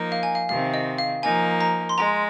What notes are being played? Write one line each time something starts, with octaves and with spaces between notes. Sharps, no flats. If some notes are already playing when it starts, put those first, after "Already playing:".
Already playing: F3 A#3 D#4
F5
G#5
F5
C3 D#3 C4 F5
D#5
F5
F3 A#3 D#4 G#5
A#5
C6
G#3 A#5